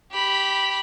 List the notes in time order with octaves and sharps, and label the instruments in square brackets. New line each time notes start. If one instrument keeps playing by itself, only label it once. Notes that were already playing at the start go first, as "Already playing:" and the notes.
[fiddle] G4 B5